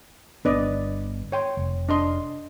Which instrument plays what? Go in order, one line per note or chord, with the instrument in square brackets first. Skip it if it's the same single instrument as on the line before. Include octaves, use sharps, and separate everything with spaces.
[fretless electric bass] G1 B3 D4 [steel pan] B4 D5 D#5
[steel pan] C#5 G5 C6
[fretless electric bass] F1
[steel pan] D4 D#5 C6